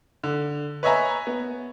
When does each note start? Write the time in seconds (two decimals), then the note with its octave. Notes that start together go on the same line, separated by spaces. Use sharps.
0.23 D3
0.83 B4 C#5 D#5 E5 G#5 A#5
1.27 B3